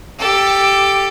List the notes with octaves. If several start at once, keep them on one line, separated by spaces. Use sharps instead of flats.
G4 A4